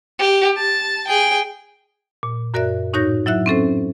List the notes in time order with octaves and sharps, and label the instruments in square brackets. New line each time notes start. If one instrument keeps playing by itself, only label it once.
[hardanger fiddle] G4
A5
G#4 G5
[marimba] A#2
F#2 F#4 A#4 D5 E5 F#6
A2 D#4 F#4 C#5 G6 A#6
F#3 E4 E5 F#6
C4 C#4 A4 C5